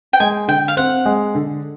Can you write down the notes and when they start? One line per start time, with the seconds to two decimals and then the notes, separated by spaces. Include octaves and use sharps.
0.13 G5
0.20 G#3 G#5
0.48 D3 G5
0.68 F5
0.77 C4 F#5
1.06 G#3
1.35 D3